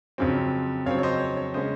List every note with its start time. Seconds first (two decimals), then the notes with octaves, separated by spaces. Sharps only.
0.18 F2 C#3 F#3 C4
0.86 F2 C#3 F#3 C4 C#5 F5
0.99 C#5
1.03 C5 D#5
1.20 C#5
1.37 C#5
1.54 C#3 G#3 C#4 C5 D#5